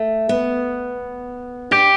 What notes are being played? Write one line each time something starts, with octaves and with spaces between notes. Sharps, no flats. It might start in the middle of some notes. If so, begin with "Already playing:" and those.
Already playing: A3
B3
D4 G4